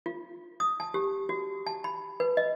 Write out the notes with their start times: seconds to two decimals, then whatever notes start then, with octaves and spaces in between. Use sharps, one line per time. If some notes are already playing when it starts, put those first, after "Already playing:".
0.06 F4
0.60 D#6
0.80 A5
0.94 G4
1.29 F#4
1.66 A5
1.84 B5
2.20 B4
2.37 D#5